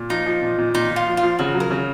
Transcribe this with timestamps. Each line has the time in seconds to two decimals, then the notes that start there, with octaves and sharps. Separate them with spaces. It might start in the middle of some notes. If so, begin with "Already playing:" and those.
Already playing: A#2
0.10 F3 D#4
0.26 F3
0.42 A#2
0.58 A#2
0.74 A#2 D#4
0.91 A#2
0.96 F4
1.07 F3
1.17 F4
1.23 F3
1.39 C#3 F#4
1.55 F#3
1.60 A#4
1.71 C#3